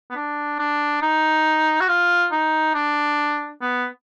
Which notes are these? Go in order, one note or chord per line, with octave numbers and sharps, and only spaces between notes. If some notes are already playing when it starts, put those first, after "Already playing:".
B3
D4
D4
D#4
F#4
F4
D#4
D4
B3